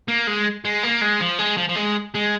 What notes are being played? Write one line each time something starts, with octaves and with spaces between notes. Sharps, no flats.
A#3
G#3
G#3
A#3
G#3
F3
G#3
F3
F3
G#3
G#3